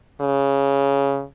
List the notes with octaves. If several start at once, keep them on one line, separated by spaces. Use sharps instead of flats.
C#3